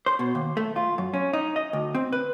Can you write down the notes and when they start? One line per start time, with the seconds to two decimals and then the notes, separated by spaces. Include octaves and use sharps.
0.06 C5
0.19 B2
0.35 D#2
0.57 A3
0.76 F4
0.98 F#2
1.14 C#4
1.33 D#4
1.56 D#5
1.73 D2
1.95 C4
2.13 B4